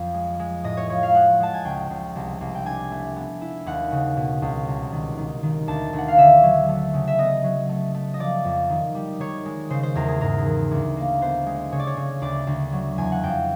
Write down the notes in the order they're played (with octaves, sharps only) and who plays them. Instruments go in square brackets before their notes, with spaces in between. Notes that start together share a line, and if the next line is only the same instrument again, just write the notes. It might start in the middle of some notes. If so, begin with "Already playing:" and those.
Already playing: [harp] F2 F3
G#3
G#3
A2 D#5
C#5
F3 C#5
F5
G#3 F#5
G#3 A5
G#5
C#2 G5
C#2
C2
C2
G5
D4 G#5
A3
B3
E4
D#2 F#5
C#3
B2
C#2
C2
D#3
D#3
D#3
D2 A5
D2
F#5
F5
D3 E5
F#3
A3
C#3
E5
B3 D#5
F#3
A3
A3
D#5
F3 D5
F2
D#3
G3
D#3 C#5
G#3
C#3 C5
C5
E2 A#4
G#4
G#2 A#4
E3
D2
A#3
B3 C5
G#3
C#3 C#5
D5
C#5
C#3
D2 D5
D2
F#3
E2 G#5
F#5
F2 G5